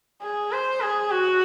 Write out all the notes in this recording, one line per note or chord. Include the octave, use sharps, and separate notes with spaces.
G#4
C5
G#4
F#4